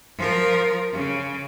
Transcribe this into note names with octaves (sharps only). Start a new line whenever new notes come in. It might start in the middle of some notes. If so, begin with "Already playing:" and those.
F3 A#4
C#3